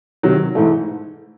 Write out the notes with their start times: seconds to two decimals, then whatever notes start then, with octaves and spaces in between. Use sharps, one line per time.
0.23 C3 D#3 F#3
0.55 G#2 E3 A3